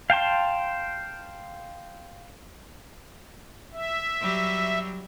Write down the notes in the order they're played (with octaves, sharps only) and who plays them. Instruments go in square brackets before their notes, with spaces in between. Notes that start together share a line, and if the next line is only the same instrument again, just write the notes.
[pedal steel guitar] F5 G5 A5 C6
[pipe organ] E5
[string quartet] F#3 G3